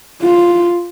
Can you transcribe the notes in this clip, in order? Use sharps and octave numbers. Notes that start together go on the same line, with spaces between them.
F4